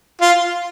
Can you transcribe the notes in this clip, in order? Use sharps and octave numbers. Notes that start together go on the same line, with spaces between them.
F4